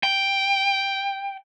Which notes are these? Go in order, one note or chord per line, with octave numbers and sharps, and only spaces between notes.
G5